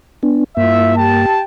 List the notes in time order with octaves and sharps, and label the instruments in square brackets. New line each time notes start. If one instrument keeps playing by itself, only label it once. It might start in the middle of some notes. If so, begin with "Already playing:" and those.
[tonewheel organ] B3 D4
[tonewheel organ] G2 A#3 [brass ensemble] E4 F4 E5
[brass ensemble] G4 G5 A5